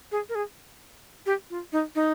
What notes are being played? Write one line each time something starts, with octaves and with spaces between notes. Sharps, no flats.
G#4
A#4
G#4
G4
F4
D#4
D#4